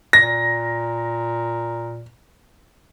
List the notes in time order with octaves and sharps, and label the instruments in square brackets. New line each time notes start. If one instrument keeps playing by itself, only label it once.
[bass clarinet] A#2 [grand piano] A#6